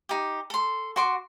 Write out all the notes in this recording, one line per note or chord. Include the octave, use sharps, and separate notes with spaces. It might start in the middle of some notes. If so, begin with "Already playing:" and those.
D#4 G4
A4 C6
F#4 C6 D6